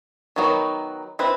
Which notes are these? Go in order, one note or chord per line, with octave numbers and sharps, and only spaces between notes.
D#3 F#3 B3 D#4 F#4
C4 E4 B4